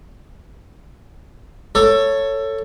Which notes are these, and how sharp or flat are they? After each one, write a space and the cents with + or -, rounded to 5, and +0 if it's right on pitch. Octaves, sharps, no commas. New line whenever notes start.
A4 +15 C#5 +0